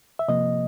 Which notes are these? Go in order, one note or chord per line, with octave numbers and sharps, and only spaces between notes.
E5
C3 F3 A#3 D#5